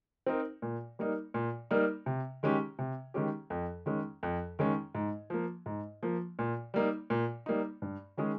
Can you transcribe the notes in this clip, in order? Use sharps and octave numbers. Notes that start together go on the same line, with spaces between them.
C4 D#4 A#4
A#2
G3 A#3 D#4 A#4
A#2
G3 A#3 D#4 A#4
C3
D#3 G#3 C#4 G4
C3
D#3 G#3 C#4 G4
F2
D#3 G#3 C#4
F2
D#3 G#3 C#4
G#2
F3 A#3
G#2
F3 A#3
A#2
G3 A#3 D#4
A#2
G3 A#3 D#4
G2
D#3 G#3 C#4 G#4